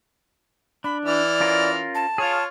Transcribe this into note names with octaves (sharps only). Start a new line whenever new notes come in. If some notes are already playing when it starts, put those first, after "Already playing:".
D4 B5
E3 D5 F6
C#4 F4 A#4
A5
F4 G#4 C#5 F5